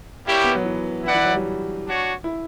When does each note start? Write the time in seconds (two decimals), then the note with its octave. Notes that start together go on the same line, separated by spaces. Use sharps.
0.24 G3 A#3 E4 G4 C#5
0.44 B3
0.55 F#3
0.64 E3
1.04 E3 E4 B4 D5 F#5
1.14 E3
1.25 F#3
1.34 G3
1.85 D4 F#4 C#5
2.24 E4